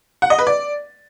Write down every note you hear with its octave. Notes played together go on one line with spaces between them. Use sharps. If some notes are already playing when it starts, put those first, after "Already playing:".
F#5
D#5
B4
D5